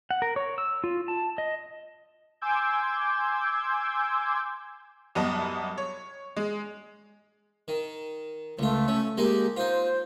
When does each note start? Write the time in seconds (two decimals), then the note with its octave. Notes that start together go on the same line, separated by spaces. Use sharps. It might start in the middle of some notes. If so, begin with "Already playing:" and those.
0.11 F#5
0.22 A#4
0.36 C#5
0.58 E6
0.84 F4
1.08 A5
1.38 D#5
2.41 G#5 C6 D6 E6 G6 G#6
5.15 C2 F#2 B3 D#5 A5
5.78 C#5
6.37 G#3
7.68 D#3
8.59 C#2 A3 F4
8.88 C#4
9.17 G#3 A#3 D#4 G4
9.56 D#4 F4 C5